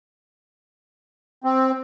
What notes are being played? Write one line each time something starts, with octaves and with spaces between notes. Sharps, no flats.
C4